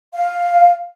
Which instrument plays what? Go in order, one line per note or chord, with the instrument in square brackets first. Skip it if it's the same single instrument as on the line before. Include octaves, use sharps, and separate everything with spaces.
[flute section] F5